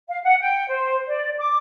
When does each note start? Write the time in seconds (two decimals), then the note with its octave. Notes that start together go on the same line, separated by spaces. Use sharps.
0.08 F5
0.24 F#5
0.41 G5
0.69 C5
1.07 D5
1.38 D6